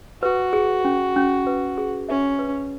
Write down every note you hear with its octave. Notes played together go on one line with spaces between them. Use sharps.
F#4 B4
G#4
C#4
C#4
B4
G#4
C#4 E5
B4